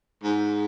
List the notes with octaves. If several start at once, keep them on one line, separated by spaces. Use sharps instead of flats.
G#2